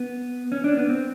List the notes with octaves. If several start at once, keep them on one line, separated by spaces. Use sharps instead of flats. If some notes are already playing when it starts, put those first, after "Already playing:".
Already playing: B3
C#4
D4
B3
C4